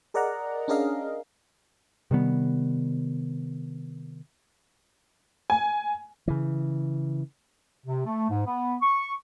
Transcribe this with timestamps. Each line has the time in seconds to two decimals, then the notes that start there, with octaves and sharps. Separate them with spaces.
0.14 G#4 A#4 D5 D#5 F#5 A#5
0.68 C#4 D4 G#4 A#4 D#5 F5
2.11 C3 D#3 G3 B3
5.50 G#5
6.28 C#3 E3
7.86 C3
8.06 A3
8.30 G#2
8.46 B3
8.82 C#6